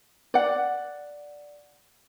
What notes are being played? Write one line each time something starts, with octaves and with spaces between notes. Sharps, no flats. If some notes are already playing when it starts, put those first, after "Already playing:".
D5 F#5